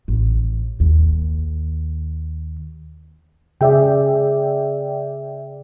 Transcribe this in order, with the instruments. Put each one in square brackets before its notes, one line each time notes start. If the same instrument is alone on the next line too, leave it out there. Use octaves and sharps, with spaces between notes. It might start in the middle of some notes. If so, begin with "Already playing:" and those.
[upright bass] A1
D#2
[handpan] C#3 G#4 [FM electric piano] D5 E5 G5